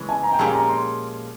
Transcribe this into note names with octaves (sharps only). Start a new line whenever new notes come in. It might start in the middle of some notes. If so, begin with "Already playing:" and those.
Already playing: C#3 E3 G#3 C#4
G#5
A#5
G5
A#2 F3 G#3 C#4 G4 G#5
A#5
C6